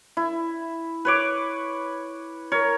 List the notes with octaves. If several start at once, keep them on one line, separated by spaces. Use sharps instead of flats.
E4
B4 C#5 D6
A#4 C#5